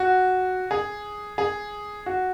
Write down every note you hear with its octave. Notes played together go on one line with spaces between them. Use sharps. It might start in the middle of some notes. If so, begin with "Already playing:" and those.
Already playing: F#4
G#4
G#4
F#4